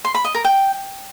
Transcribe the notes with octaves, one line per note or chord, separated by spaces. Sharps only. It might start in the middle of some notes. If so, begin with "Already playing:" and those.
C6
B5
D#5
A#4
G5